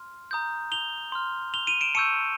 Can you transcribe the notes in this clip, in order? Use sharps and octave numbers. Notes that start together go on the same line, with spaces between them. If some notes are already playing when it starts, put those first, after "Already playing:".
Already playing: C6 F6
A#5 D#6 G6
F7 G7
C6 F6
F7 G7
D#7 F7
D7 E7
A5 C#6 E6 G6 C#7 D#7